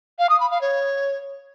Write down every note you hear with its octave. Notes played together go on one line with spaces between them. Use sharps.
F5
D#6
B5
F5
C#5